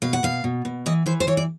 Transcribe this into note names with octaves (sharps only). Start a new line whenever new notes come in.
B2 F5
F#5
B2 F5
B2
B2
E3 D#5
E3 C5
C5
E3 C#5
D5